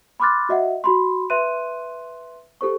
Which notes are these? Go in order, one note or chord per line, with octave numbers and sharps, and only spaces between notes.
B5 C6 D6 F6 F#6 A6
F#4 D#5 E5 F#5
F#4 B5 C6
B4 E5 C6 F#6 D#7
G4 A4 C5 C#6